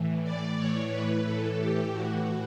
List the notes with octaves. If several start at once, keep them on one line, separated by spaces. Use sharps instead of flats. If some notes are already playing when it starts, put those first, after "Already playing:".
Already playing: A2 E3
D5
A2 E3 C#5
B4
A2 E3 A4
G4
A2 E3 F#4